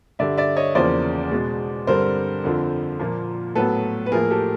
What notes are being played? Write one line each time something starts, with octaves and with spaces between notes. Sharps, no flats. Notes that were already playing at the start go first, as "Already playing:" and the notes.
G2 D3 G3 D5 E5
D5 E5
C#5 D#5
E2 C#3 F3 A#3 C5 D5
B2 G#3 B3
G2 D3 G3 C4 A#4 C5
F2 D3 F3
A#2 F3 A#3
A2 F#3 B3 A4 B4
B4
A2 F3 A#3 G#4 A#4
G4 A4